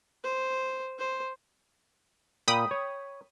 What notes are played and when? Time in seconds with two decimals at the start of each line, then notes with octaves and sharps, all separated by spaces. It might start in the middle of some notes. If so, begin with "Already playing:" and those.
0.24 C5
0.98 C5
2.48 A#2 G5 B5 D#6
2.71 C#5